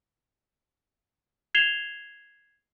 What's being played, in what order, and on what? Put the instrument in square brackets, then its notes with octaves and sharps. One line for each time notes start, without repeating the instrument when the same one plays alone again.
[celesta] G#6 C7 E7 F7 G7